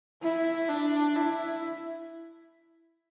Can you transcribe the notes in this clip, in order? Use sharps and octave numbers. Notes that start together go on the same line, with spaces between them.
E4
D4
E4